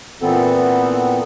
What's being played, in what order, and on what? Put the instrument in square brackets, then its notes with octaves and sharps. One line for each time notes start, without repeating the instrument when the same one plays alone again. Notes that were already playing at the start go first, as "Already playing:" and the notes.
[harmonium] A#2 E3 B3 C4 A4